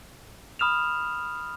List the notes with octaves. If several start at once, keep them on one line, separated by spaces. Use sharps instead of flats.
B5 D#6 F6 E7 F7